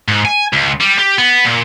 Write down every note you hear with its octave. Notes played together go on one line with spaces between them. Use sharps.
G#2
G#5
C#2
G3
G4
B3
A#2